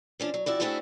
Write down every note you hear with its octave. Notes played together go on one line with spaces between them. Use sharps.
F3 C#4 D4
F#3
F2 E4 F#4 D5
A3 C4 D4 E4 F#4 G#4